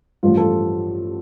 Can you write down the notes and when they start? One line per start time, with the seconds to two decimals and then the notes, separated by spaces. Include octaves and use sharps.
0.23 A1 G2 F3 F4
0.37 F4 A4